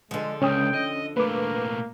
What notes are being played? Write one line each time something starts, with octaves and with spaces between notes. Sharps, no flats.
D3 F3 G#3
C#2 C#4 G5 D#6
D#5
A#2 A3 A#3 B4 D6